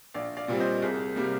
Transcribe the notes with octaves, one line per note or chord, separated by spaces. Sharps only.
A#1 D5 F5
D5 F5
A#2 G3 C4
C5 D#5
C2 G#4
C3 G3 A#3